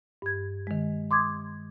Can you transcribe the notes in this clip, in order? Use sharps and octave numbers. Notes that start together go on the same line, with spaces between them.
G2 G#6
D#3 G#3
C6 D6 D#6 G#6